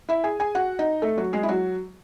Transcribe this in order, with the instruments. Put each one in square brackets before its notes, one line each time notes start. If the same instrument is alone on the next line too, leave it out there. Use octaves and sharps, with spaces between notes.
[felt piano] E4 E5
G#4 G#5
G#4 G#5
F#4 F#5
D#4 D#5
A3 A4
F#3 F#4
G#3 G#4
E4
F#3 F#4